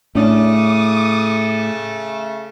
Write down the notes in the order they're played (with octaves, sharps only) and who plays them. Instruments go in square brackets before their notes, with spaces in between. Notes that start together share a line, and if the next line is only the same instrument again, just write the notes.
[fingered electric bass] A2 [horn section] C#3 A3 [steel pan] C#4 D4 [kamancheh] D6 D#6